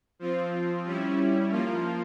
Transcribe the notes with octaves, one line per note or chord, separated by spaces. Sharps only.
F3 C4 F4
G3 C#4 E4
F3 A#3 F4